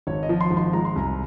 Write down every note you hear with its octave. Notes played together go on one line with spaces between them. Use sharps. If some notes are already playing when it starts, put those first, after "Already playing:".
G#1 C#5
D#5
F3
C6
G#1
C6
G#3 A#5
C6
C2 A#5